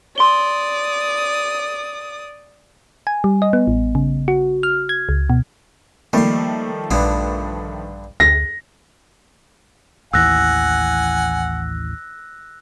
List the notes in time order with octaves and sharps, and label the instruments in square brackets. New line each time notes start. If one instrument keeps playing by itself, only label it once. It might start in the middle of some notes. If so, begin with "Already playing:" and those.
[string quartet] D5 D#6 [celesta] C6 G7
[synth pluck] G#5
G3
D#5
B3
A1
C#3
F#4
F6
G#6
C#2
B2
[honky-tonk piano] D#3 F3 A3 [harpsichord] G3 C6 [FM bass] A#3
[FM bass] A#1 [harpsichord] G2 D3 B3
[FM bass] D2 [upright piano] A#6
[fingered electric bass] A1 D#2 E3 [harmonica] F#5 G#5 [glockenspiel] E6 F#6 A#6